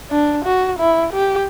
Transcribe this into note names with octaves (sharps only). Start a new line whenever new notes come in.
D4
F#4
E4
G4